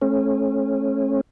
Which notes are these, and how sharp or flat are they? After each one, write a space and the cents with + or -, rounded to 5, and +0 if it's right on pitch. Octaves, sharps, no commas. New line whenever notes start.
A3 -30 C#4 -30